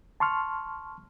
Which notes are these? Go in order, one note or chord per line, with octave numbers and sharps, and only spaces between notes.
A5 C6 C#6 F6